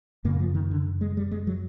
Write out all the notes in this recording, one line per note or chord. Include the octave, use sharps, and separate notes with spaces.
F#2 C#3 A#3
F3
D#3
D3
G#3
G3
G#3
F#3